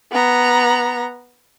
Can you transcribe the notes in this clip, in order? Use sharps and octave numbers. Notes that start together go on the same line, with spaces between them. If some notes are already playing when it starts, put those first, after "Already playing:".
B3 A#5